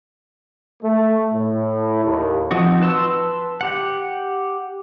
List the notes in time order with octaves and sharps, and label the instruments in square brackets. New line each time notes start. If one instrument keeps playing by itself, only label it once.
[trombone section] A3
A2
D#2
[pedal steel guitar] F3 C4 D#4 F#4
B4 A5 C6 E6
G4 F#5